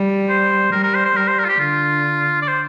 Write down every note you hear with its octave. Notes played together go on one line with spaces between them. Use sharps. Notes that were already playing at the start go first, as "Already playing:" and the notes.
Already playing: G3
C5
G3 A#4
A#4
C5
C5
G3 A#4
C5
A#4
F4
G4
D3 F4
D5
C5